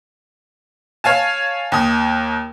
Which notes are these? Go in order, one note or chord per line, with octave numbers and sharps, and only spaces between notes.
C#5 F5 G#5 A5
D#2 D#6